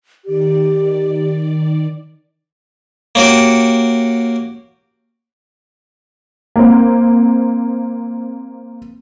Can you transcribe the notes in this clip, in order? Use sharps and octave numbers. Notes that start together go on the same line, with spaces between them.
D#3 G4 D5
A#3 C#4 F#4 G4
A#3 C4